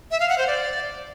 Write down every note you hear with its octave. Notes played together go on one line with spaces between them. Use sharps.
E5
F5
F#5
C5
D5